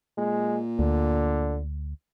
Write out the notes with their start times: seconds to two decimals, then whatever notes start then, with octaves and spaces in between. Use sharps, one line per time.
0.18 A#2 G#3
0.79 D2 D3